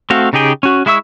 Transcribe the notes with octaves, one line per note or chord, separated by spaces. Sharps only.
A3 C4 F#4 F5
C#3 D#4 G4 G#4 G5
C#4 F#4
G#3 E4 E5 C#6 E6